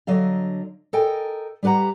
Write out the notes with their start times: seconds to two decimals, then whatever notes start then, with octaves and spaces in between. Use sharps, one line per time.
0.07 D3 F#3 D#5 F5
0.93 A4 A#4 D#5 G5 G#5
1.63 G3 G4 B4 F#5 A#5